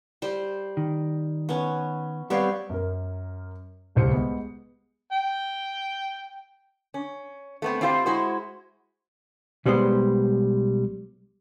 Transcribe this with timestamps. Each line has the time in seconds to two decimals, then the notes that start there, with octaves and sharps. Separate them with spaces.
0.22 G3 C5
0.77 D#3
1.49 B3 C#4
2.30 G3 B3 C4 C#5 D5 F5
2.70 F#2 A#4
3.95 D1 C2 C5 C#7
4.12 G#3 B3
5.12 G5
6.94 C#4
7.62 A3 B3 C4
7.81 C4 D4 E4 F4 G4 C5
8.06 G#3 E4 F#4 C5
9.65 B1 G3 G#3 B3 C5